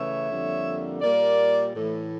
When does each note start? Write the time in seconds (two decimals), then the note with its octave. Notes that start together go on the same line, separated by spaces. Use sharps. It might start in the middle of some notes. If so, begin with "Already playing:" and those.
Already playing: C#3 E3 A3 C#5 E5
0.30 F2 D3 G3 A#3
1.01 A#2 G3 A#3 A#4 D5
1.74 A2 E3 A3